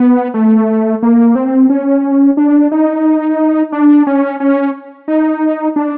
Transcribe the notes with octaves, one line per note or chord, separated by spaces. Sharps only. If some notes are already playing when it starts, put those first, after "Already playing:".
Already playing: B3
A3
A#3
C4
C#4
D4
D#4
D4
C#4
C#4
D#4
D4